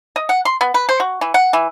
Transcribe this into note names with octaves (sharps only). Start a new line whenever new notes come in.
D#5
F#5
C6
B3
B4
C5
F#4
E3
F#5
E3